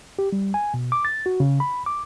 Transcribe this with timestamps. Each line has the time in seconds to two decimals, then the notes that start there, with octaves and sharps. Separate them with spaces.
0.19 G4
0.32 G3
0.54 G#5
0.74 B2
0.92 D6
1.05 A6
1.26 F#4
1.40 C#3
1.60 B5
1.86 D6